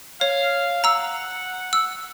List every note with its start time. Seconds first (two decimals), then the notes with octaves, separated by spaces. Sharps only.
0.21 C#5 F5
0.84 F#5 A#5 E6
1.73 E6